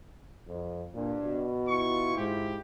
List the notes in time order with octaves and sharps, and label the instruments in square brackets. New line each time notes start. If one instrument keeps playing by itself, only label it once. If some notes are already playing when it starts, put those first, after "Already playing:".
[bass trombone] F2
[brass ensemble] C2 G2 D4 [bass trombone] A#2
[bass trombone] B2
[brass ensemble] E4 F4 [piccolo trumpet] C#6
[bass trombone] G#2 [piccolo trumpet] G4